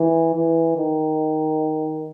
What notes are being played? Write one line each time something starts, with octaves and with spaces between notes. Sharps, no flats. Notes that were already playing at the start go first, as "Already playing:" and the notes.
Already playing: E3
E3
D#3